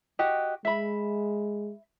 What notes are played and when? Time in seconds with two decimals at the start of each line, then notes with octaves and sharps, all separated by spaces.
0.19 F#4 G4 D#5
0.65 G#3 E5 B5